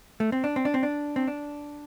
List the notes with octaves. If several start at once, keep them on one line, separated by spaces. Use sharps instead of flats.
A3
C4
D4
C4
D4
C4
D4
C4
D4